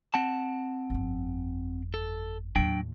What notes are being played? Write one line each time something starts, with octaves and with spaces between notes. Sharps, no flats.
C4 F#5 A5
G1 F2
A4
D#2 A2 F#3 D4 G5